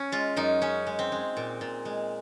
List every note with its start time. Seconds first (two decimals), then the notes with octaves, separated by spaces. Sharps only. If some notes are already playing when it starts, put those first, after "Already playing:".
Already playing: C#4
0.12 G#3 F4
0.37 F#2 D#4
0.62 G#3 C#4
0.87 G#3
0.99 C4
1.12 G#3
1.37 A#2
1.61 A#2
1.85 G#3